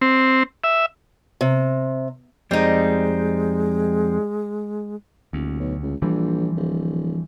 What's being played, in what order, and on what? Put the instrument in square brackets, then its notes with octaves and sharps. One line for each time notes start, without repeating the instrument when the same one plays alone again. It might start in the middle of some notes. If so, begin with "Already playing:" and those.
[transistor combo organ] C4
E5
[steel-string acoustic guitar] C3
[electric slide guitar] F2 C4 [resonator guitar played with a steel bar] G3 D#4 [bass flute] G#3
[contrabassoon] D#1 [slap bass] D2
[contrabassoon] B1
C#2
[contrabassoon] A#1 [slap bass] E3 F3 G3
[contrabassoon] D1